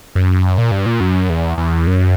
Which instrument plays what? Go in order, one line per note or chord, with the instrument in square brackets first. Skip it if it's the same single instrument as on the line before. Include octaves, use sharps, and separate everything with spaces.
[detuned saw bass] F#2
A#2
G2
A#2
F#2
E2
E2
F#2